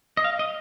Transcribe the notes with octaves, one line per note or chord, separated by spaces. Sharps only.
D#5
F5
D#5